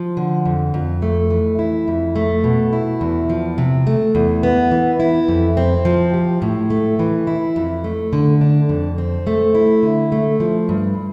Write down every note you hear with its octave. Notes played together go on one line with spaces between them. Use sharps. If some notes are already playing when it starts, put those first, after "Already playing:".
Already playing: F3
D3
F2
F2
A3
E3
E4
F2
A3
B2
E4
E2
F3
C3
A3
E2
B3
E3
E4
F2
C4
F3
G4
A2
A3
E3
E4
F2
A3
D3
D4
F2
C4
A3
E4
D3
A3
F3
G2